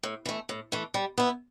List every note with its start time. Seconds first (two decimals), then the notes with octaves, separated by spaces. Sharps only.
0.03 A2
0.26 E3 A3
0.49 A2
0.72 E3 A3
0.94 G3
1.18 B3 E4